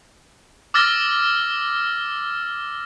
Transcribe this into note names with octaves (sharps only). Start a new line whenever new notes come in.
D6 E6 F6 A6 A#6 G7